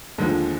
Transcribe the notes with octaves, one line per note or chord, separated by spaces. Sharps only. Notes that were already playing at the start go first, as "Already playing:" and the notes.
D#2 D3 F3 G#3